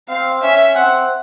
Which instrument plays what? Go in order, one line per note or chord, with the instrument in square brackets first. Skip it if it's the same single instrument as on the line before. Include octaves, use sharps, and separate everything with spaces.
[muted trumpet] C4 [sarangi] F5
[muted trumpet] C#4 [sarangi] E5
[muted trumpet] C4 [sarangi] F#5